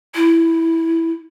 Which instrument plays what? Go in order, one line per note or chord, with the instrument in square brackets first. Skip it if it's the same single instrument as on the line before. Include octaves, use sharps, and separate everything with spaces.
[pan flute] E4